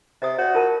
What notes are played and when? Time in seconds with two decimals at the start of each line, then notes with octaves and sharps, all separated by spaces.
0.22 C3 D#5 D#6
0.38 F#4 C#5 D5
0.54 F4 A#4 A5